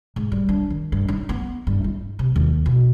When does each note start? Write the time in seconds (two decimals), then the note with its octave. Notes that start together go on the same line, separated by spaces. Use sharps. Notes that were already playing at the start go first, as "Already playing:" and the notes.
0.16 G#2
0.32 G3
0.49 D4
0.70 D#3
0.92 G2
1.08 D#4
1.29 B3
1.67 G2
1.84 E4
2.19 C3
2.36 D#2
2.66 B2